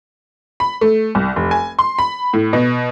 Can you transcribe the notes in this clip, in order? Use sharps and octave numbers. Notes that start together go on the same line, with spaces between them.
B5
A3
C2
F1
G#5
C6
B5
A2
B2